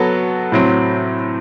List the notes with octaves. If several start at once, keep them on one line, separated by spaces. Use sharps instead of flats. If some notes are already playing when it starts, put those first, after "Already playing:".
Already playing: F#3 B3 F#4 A4
A2 F#3 C4